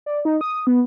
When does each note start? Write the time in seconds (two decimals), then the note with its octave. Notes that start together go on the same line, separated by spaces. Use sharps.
0.06 D5
0.25 D#4
0.41 D#6
0.67 B3